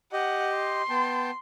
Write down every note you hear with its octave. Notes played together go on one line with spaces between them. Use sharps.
G4 D#5 F#5
C6
B3 G5 A5